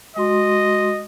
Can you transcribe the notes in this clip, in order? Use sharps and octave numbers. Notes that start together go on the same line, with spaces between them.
G#3 F#4 D#5 C6